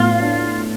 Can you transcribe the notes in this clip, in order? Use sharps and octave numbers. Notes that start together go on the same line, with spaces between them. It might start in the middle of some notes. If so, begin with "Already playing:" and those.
Already playing: A2 B3 F4
D4